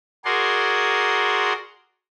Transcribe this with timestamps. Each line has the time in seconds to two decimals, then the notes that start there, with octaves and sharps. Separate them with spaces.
0.25 F#4 G#4 A#4 D5 C6